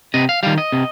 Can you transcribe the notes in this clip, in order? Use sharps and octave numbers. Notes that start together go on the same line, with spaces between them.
C3 D#5
F5
D#3 G3 F5
D#5
C3